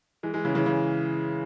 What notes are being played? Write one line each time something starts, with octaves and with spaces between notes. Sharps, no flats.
E3 G#3
E3 G#3
C#3 E3
C#3 E3
C#3